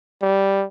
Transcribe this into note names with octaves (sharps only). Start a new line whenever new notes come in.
G3